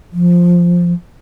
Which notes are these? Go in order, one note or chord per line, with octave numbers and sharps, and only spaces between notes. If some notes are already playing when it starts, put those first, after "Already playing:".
F3